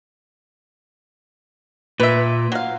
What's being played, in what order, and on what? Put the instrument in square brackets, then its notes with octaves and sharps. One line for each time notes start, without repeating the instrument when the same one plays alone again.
[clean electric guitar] A#2 [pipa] B4 E5
[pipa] F#3 F5